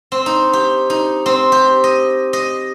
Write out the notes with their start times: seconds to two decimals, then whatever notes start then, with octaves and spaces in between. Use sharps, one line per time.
0.12 C4
0.26 D#4
0.53 G4
0.90 D#4
1.26 C4
1.52 G4
1.84 D#5
2.33 D#5